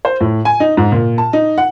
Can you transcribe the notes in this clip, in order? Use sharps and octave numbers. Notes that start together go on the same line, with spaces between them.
C5
A2
G#5
D#4
G#2
A#2
A5
D#4
F#5